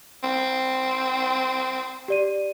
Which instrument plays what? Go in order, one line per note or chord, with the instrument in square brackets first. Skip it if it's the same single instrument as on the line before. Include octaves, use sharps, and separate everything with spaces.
[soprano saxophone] C4
[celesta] G4 D5 D#7